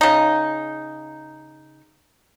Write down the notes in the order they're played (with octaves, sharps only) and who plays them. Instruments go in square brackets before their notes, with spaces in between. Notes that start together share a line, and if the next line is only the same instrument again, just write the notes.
[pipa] C#3 D#4